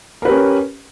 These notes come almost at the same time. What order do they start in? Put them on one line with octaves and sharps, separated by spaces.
A#4 B4 G4 C#4